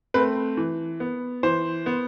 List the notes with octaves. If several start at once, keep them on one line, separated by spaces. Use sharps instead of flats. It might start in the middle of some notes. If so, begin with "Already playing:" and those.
A3 C4 B4
E3
B3
E3 C5
B3